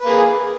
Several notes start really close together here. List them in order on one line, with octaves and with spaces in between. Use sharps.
B4 A#3 G#4